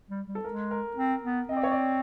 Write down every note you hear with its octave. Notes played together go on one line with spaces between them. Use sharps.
G3
G3
A4
G#3 A#4
A#4
C4
B3
C4 D#5
D5
C#5
D5